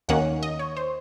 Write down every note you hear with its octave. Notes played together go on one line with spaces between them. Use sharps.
D#2 D#3 A#3 C#4 F#5
D#5
C#5
C5